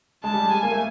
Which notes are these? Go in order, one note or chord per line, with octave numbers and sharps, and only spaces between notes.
G#3 A5
G3
G#3
G#5
A#3
A3